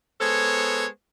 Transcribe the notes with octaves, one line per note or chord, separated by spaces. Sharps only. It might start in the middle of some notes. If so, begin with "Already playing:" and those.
G#3 B3 A4 C5 C#5